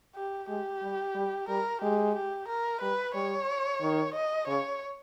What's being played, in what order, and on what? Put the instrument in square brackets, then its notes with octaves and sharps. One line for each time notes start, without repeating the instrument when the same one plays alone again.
[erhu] G4
[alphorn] G#3 [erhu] G4
[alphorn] G3
G3
[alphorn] G3 [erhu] A#4
[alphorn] G#3 [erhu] G4
[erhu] G4
A#4
[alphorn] G3 [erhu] B4
[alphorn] G3 [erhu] C#5
[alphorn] D#3
[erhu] D#5
[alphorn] C#3 [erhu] C#5